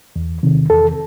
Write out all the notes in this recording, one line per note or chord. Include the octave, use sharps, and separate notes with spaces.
E2
C3 D#3
E2 A4